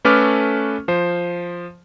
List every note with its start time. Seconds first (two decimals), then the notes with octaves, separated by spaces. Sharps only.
0.05 A3 C#4 A4 B4 D6 F6
0.88 F3 C5